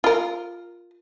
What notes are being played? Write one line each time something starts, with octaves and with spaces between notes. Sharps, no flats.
F4 A#4